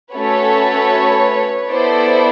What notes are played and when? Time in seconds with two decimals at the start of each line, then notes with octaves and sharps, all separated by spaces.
0.14 A3 C#4 F#4 A4 B4 C#5
1.71 B3 E4 A4 C5 D5